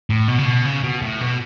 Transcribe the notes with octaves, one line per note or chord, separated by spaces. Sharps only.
A2
B2
C#3
B2
C#3
B2
A2
B2